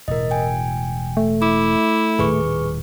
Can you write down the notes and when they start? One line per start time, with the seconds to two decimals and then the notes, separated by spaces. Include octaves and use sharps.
0.08 E1 A2 A#4 D#5
0.31 G5 G#5
1.17 A3
1.42 E4 D6
2.19 D#1 A2 D#3 G#4 B4 C#6